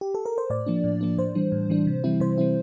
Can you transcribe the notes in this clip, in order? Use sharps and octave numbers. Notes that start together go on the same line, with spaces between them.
G4
A4
A#4
C5
A2 D5
F3 A#3 D4
A2
F3 A#3 D4
A2 C5
E3 G3 D4
A2
E3 G3 D4
C3
E3 G3 C4 E4
C3 C5
E3 G3 C4 E4